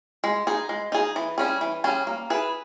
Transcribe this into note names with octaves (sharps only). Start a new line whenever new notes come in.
G#3
D#4 G#4
G#3
D#4 G#4
E3
G3 C#4 G#4
E3
G3 C#4 G#4
A#3
E4 G#4 B4